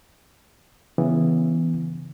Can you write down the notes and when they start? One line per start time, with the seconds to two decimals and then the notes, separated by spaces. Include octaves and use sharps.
0.98 C#3 E3 B3